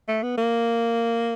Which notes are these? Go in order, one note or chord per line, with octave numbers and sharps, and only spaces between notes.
A3
B3
A#3